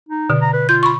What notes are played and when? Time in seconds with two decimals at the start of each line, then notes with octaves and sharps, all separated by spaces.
0.08 D#4
0.30 B2 D3
0.42 A#5
0.53 B4
0.69 F4 G6
0.83 B5 C#6